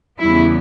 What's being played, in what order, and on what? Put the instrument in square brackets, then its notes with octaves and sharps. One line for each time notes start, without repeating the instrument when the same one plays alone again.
[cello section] E2 C#3 G3 B3 E4